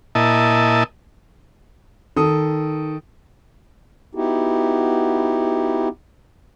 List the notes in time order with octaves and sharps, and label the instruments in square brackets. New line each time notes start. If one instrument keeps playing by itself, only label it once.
[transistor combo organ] A#2 E4 D#5 A5
[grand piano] D#3 A4 D#6
[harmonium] B3 D#4 E4 F#4 G4